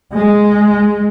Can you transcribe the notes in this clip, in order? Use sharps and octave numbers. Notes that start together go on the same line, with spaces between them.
G#3